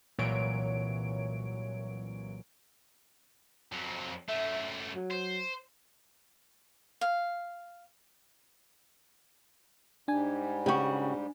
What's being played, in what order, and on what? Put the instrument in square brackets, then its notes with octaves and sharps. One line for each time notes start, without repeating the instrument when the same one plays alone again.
[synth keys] C2 A#2 E3 F#3 C#5 D7
[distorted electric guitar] F2 F#3
[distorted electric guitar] F#2 A3 [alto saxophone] E5
[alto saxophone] F#3
[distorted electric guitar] C5
[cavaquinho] F5
[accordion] G#2 G3 [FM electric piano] D4 G#5
[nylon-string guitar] C#3 F#4 [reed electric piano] G4 G5 C#6